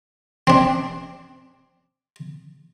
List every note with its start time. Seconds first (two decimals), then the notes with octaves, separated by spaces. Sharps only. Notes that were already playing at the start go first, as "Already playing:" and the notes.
0.47 C4 D4